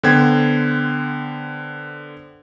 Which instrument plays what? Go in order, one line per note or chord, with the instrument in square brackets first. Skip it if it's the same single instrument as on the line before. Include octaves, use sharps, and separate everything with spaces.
[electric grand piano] D3 B3 C5 F#5 G5 G#6